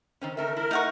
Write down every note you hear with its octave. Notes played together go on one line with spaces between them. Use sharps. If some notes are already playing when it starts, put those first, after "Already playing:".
D#3 C4 C#4
D#3 A3 A4 A#4 E5
E4 A#4
D#4 F#5 C#6